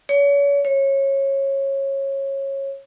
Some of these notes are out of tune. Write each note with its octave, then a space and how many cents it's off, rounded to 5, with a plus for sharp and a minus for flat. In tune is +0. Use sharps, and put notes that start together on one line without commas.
C#5 +35
C#5 -20